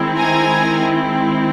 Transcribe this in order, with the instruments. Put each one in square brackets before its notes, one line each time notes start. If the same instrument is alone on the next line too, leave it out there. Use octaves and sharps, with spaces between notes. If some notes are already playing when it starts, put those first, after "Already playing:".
Already playing: [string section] D#3 G#3 C4 E4
G#5 A#5